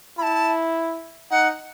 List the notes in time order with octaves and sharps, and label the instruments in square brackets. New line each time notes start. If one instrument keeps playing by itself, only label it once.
[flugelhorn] E4 [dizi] A5 B5
[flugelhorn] D#4 [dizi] F#5